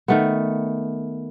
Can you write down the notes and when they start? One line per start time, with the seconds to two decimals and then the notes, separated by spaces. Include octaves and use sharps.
0.08 D#3 A3 B3